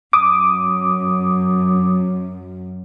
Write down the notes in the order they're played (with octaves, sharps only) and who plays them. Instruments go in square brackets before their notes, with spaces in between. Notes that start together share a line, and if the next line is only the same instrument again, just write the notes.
[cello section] F#2 [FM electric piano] D6 D#6